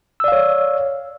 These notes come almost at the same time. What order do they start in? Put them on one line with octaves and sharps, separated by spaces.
E6 D5 F5 C#5